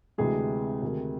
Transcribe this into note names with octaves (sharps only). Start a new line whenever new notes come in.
D2 C3 E3 G#3 G#4
D2 C3 D#3